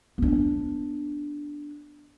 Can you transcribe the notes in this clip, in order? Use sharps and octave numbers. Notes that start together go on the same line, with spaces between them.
B3 D4